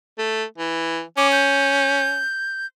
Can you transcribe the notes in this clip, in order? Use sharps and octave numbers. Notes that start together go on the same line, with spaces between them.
A3
E3
C#4 D6
G6